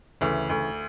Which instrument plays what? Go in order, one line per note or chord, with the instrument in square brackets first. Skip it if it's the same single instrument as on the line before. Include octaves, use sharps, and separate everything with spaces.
[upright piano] D2 [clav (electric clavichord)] C#3 E3
[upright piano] D2